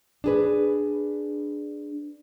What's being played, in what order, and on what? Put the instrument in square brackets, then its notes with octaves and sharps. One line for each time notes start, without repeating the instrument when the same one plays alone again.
[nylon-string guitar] D4 G#4 B4